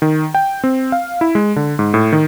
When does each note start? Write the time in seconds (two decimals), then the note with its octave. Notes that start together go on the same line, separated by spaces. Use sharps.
0.02 D#3
0.35 G5
0.64 C4
0.92 F5
1.21 E4
1.35 G#3
1.56 D3
1.79 G#2
1.94 A2
2.12 D#3